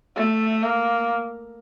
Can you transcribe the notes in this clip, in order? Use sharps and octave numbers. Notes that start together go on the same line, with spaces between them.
A3
A#3